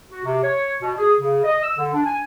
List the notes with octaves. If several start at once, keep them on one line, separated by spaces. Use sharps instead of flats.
F#4
C3
C#5
B2
G#4
C#3
D#5
E6
D3
D4
G#5